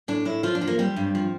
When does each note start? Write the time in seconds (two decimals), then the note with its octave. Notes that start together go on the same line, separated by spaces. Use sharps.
0.08 A2 D4
0.25 A2 E4
0.43 F3 F4
0.55 D4
0.61 F3
0.67 A#3
0.79 G3 C4
0.96 G2
1.15 F3